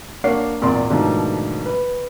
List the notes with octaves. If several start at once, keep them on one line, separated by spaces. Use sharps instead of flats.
A#3 D4 C#5 F#5 C7
G#1 E2 A#2 D5 C6
G#2 B2 D#3 F3 A3 D4
B4